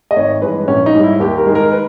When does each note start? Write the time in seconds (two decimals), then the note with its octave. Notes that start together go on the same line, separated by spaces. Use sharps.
0.11 D#5
0.16 G#1 C#5
0.42 G2 E3 G#3 B4
0.68 A#1 C#4
0.86 D#4
0.95 G#2 G3
1.03 E4
1.20 D#2 G4
1.38 A#4
1.46 D#3 G#3
1.55 A#4
1.72 B4